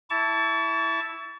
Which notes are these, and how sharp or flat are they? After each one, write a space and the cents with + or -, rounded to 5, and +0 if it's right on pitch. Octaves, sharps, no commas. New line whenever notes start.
E4 +0 A5 +0 C#6 +40